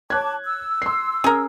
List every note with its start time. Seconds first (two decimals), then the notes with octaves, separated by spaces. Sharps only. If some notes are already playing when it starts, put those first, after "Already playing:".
0.10 C#5 A5 D6 F#6 G#6
0.45 E6
0.82 C6 C7
1.24 C#4 G#4 A#4